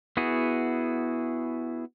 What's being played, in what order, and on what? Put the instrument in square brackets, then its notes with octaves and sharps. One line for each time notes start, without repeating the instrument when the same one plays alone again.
[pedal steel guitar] B3 E4 F#4 G#4